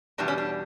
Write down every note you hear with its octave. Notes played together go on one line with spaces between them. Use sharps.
E2 B2 G3 D4
C#4
D4